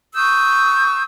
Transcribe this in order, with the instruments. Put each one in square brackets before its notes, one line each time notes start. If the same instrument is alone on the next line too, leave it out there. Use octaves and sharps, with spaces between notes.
[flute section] C#6 D#6 E6 G6